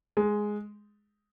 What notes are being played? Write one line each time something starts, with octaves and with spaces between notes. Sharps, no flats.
G#3